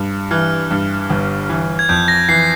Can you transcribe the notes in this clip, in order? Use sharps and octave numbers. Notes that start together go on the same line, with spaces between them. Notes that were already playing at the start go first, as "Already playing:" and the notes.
Already playing: G2
E3 F6
G2
G1
E3
G#6
F2 G6
A#6
E3 C7